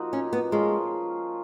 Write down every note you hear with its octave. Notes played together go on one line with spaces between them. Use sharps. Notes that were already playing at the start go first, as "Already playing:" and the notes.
Already playing: F3 A#3 D#4 F#4
C#4
B3
F3 G#3 A#3 C#4 F4